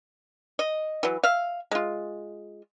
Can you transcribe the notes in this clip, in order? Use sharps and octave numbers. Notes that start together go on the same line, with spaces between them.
D#5
E3 F#3
E5 F5
G#3 F4